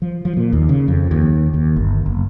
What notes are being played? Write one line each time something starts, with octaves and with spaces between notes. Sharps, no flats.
F3
F3
A#2
D#2
C#3
F2
D#2
D#2
G1
F#1